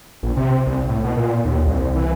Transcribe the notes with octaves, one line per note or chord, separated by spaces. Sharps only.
A#1
C3
C2
A2
B2
A#2
D#2
C2
E3